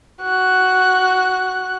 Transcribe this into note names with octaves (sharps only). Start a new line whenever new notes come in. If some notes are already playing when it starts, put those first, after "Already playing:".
F#4 F#6